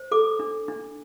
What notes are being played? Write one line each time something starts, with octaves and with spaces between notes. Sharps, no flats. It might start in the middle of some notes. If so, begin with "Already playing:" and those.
Already playing: C5
A4 D6
D4
D4